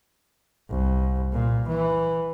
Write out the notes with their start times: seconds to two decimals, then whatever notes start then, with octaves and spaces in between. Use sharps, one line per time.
0.70 C2
1.32 A#2
1.68 E3